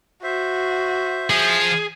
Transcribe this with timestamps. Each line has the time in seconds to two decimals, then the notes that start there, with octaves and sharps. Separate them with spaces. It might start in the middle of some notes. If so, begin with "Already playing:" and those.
0.23 F#4 C5 E5
1.30 F3 G#4